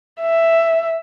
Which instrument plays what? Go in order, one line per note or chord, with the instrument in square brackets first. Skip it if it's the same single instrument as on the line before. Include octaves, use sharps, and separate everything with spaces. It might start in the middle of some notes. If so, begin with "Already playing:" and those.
[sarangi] E5